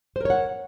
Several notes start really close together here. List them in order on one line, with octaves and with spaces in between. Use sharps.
C5 A#4 C#5 F#5